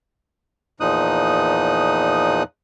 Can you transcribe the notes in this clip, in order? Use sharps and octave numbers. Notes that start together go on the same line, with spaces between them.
E2 A#2 F3 D#4 D#6 F#6